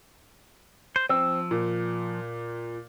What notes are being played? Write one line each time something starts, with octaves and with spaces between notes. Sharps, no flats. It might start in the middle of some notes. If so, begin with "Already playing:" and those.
C5
F3 C4 E6
A#2